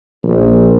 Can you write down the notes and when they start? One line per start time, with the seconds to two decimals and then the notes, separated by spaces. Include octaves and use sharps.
0.23 A#1